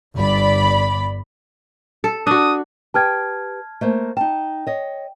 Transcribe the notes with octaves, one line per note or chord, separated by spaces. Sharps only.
G1 D5 B5
A4
D4 F#4 D#6
G4 B4 G5 A5 F6 G#6
A3 A#3 C5
D#4 G5 A5
C#5 D#5